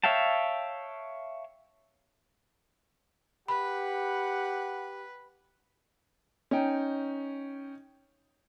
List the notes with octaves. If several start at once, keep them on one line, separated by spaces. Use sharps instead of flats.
C#5 E5 F5 G5 A5
G4 B4 F#5 B5
C#4 D#4 G5